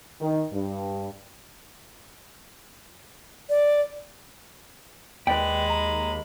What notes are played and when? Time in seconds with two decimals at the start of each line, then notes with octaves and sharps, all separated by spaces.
0.21 D#3
0.53 G2
3.50 D5
5.27 D#2 G#3 B4 D5 G5 B5
5.70 A#5